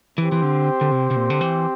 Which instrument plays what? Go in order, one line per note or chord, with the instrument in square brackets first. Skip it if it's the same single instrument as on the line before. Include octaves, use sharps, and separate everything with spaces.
[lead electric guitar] E3 [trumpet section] C4 G4 C5
[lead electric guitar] E3
D3
D3
C3
C3
A#2
D3
E3